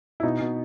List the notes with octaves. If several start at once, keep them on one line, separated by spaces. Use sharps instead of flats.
E4
B2 D#4
B2